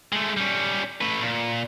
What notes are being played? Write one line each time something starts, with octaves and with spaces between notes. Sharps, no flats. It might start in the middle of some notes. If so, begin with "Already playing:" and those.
G#3 A3
G3 C#4
A3 B4
A#2